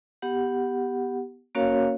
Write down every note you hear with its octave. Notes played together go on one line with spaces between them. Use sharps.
B3 G4 F#5
A#3 C#4 F#4 A#4 C#5 F5